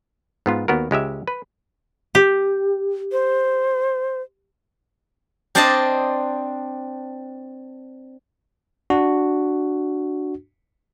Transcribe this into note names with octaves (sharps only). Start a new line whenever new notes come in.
G#2 B3 F4
D#2 B3 F#4 A#4
C#2 G#3 G4 E5
B4
G4
C5
C4 D4 C5 D5 D#5 A5
D4 F#4